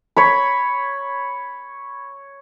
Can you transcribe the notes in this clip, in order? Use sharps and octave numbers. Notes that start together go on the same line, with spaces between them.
C#5 B5